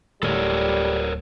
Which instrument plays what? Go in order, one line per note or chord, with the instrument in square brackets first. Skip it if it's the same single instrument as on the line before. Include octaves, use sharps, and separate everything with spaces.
[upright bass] D1 [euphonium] G3 [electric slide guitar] A4 A#4 C#5